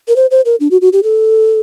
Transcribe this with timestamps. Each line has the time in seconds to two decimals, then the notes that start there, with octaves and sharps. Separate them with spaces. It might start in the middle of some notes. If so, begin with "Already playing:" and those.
0.08 A#4
0.16 C5
0.31 C5
0.45 A#4
0.60 D4
0.71 F#4
0.81 F#4
0.93 G4
1.03 A4